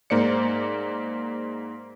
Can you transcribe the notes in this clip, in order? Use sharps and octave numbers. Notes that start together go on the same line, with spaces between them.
G#2 A#3 C5 D5 C#7